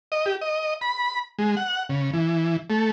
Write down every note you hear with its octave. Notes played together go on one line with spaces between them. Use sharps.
D#5
G4
D#5
B5
G#3
F#5
C#3
E3
A3